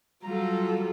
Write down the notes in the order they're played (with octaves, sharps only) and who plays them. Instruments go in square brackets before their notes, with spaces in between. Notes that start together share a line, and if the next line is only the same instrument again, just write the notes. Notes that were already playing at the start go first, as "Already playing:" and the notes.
[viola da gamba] F#3 F4 [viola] G3 A4 [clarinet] A#5